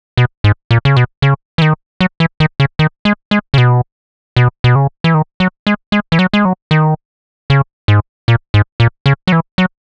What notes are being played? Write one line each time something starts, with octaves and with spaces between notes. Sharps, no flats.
B2
G#2
A#2
C#3
B2
C#3
E3
D#3
F#3
E3
D#3
C#3
D#3
G#3
G#3
C#3
B2
B2
B2
C#3
E3
D#3
F#3
G#3
G#3
E3
F#3
G#3
F#3
D#3
C#3
G#2
A#2
G#2
A#2
C#3
F#3
E3
F#3